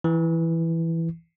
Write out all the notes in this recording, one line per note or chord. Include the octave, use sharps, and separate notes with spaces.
E3